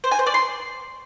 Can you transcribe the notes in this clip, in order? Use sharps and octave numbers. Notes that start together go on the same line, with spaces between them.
C5
G#5
C5
D5
C6